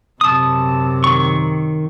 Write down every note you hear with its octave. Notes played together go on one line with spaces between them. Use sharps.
F#2 C3 A5 D#6
D#3 C#6